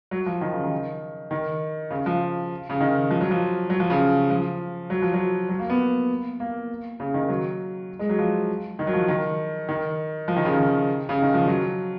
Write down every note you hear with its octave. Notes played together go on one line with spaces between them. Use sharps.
F#3
F3
D#3
C#3
D#3
D#3
C#3
F3
C#3
D#3
F3
F#3
F3
F#3
F3
C#3
F3
F#3
F3
F#3
F#3
A#3
B3
A#3
C#3
D#3
F#3
G#3
F#3
F3
D#3
F#3
F3
D#3
D#3
F3
D#3
C#3
D#3
C#3
D#3
F3
F#3